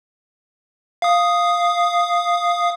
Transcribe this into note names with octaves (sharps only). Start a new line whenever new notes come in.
F5 D#6